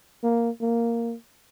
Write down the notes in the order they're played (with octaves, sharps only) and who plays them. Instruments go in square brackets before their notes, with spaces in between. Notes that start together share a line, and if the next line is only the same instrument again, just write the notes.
[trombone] A#3
A#3